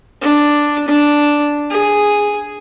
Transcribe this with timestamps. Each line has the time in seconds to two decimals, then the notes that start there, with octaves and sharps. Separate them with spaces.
0.22 D4
0.88 D4
1.70 G#4